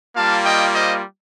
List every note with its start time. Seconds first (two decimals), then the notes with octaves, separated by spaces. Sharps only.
0.15 G3 A#3 F4 F5 A5
0.45 D#5 G5
0.74 C5 D#5